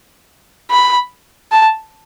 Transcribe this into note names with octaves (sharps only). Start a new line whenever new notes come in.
B5
A5